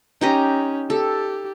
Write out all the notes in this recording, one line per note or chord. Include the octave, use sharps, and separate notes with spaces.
C#4 D#4 G4 D#5
G4 A4